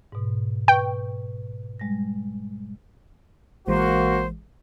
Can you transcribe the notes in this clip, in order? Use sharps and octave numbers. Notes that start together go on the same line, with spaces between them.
G#2 B2
B4 G5 C#6
G3 G#3 A#6
A1 E3 G#3 A#3 F#4 C5